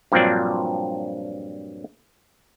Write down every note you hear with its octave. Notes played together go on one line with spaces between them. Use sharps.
G2 A#2 F3 F#3 C4 D4